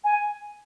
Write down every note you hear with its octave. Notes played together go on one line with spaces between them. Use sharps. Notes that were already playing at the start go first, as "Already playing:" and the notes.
G#5